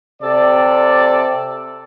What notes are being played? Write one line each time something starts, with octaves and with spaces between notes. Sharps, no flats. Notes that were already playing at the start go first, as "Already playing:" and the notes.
C3 A4 D5